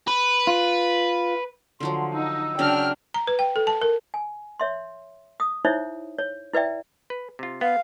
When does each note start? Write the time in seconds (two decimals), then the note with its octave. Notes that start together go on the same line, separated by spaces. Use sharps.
0.07 B4
0.47 F4
1.80 D3 F3 F#3 C6
2.13 D#4 E6
2.59 C#3 F#3 C#4 D4 G5 F6
3.14 A#5
3.27 B4
3.39 G5
3.56 A4
3.67 A5
3.82 A#4
4.14 G#5
4.60 C#5 E5 C6
5.40 D#6
5.65 D#4 E4 C5 C#5 E5
6.19 C#5
6.53 E4 B4 D5 E5 G5
7.10 B4
7.39 C3 F4
7.61 B3 F5